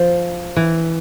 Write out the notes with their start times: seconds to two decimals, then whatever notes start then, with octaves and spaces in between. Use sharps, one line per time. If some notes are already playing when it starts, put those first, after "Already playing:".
Already playing: F3
0.56 E3